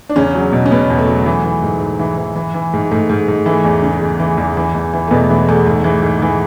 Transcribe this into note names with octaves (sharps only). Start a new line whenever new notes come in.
D4
E2 C#3 C#4
F#3
B2
C#4
B2 B3
E2
A3
F#3
E3
E3
G#2
G#2
E3
E3
E3
E3
G#2
G#2 A3
G#2
G#2
E3 A3
E2
C#3
E2
E3
E2
E3
E2
E3
A3
E2 B2 B3
E3 G#3
E2 A3
G#2 A3
E3
G#2
E3